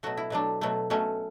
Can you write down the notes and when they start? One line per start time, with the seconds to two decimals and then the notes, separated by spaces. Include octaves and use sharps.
0.03 B2 F#3 A3 F#4
0.17 E4
0.30 B2 F#3 A3 D4
0.61 B2 F#3 A3
0.90 B2 F#3 A3 C#4